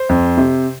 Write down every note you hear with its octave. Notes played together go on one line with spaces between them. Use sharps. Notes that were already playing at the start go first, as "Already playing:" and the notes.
Already playing: C5
F2
C3